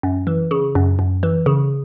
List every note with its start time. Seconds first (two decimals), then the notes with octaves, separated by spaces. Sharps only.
0.03 F#2
0.27 E3
0.51 C#3
0.75 F#2
0.99 F#2
1.23 E3
1.46 C#3